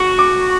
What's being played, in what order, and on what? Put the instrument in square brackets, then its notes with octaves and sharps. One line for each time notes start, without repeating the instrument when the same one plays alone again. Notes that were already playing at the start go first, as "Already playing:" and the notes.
Already playing: [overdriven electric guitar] F#4 [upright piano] C#6
[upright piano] D6